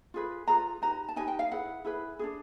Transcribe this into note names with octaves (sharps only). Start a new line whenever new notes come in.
F4 G#4 B4
F4 G#4 B4 A#5
D#4 G4 B4 A#5
A5
D#4 G4 B4 G#5
G5
F5
E4 G#4 B4 F#5
E4 G#4 B4
D4 F4 G#4